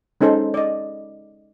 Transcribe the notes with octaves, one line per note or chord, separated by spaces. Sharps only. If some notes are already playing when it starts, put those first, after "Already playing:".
G#3 C#4 D#4 A4 C5
D5 D#5